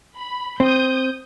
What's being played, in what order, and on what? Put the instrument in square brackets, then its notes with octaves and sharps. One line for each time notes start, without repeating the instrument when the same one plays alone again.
[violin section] B5
[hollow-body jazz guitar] C4 [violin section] D#6 G6